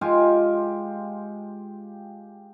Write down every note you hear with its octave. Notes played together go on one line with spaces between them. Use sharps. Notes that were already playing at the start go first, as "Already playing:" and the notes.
G#3 F4 G4 G#5